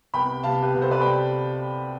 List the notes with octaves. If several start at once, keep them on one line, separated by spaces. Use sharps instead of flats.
C2 C3 G3 B3 G5 B5
C2 C3 G3 B3 F5 A5
G4 B4
C2 C3 G3 B3
A4 C5
B4 D5
C3 G3 G5 B5